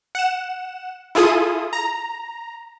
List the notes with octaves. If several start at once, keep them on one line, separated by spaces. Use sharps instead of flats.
F#5 E7
E4 F4 G#4 A4 D#6
A#5